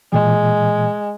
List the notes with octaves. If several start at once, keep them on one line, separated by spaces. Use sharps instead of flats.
A#2 E3 G#3